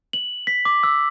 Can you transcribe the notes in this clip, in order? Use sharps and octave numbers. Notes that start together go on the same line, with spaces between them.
F#7
B6
D6
E6